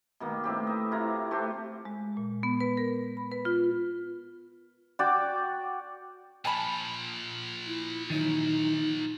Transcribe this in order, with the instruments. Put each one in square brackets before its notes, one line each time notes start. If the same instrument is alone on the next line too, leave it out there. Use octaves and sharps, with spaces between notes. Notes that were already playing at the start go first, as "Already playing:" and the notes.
[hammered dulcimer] B2 D#3 A#3
A2 C4 G4
D#5 E5
C3 E4 F4 A#5
A3 F#4 G4 C5
[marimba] G#3
A#2
B3
B4
A#4
B5
B4
F4
[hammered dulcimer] F#4 D5 G5
[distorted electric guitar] A#2 F3 [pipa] G#5 A5 B5
[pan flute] E4
[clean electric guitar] D#3 E3 F#3 [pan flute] D#4